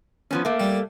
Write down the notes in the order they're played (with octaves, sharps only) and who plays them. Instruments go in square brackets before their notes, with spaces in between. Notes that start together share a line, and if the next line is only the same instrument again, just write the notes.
[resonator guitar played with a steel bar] F3 B3 C#4
A3 A#3
[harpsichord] G3